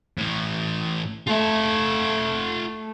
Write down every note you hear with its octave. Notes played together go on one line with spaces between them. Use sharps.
A2 E3
A3 F4 E5